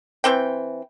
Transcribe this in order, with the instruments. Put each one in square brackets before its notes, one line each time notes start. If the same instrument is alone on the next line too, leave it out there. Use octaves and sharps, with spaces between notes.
[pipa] E3 C4 G5